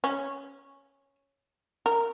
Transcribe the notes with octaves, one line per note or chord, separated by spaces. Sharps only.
C#4
A#4